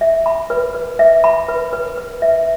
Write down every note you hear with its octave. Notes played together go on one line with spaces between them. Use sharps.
E5
B5
B4
B4
E5
B5
B4
B4
B4
E5